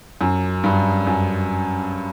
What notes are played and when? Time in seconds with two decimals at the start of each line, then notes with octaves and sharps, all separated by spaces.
0.21 F#2
0.64 G2
1.07 F#2